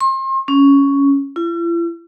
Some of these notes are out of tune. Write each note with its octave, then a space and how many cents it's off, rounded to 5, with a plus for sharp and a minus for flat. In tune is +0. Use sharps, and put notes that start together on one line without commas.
C6 +35
C#4 +5
E4 +45